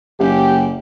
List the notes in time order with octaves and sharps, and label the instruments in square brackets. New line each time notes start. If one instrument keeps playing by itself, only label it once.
[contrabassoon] F#1 [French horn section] G4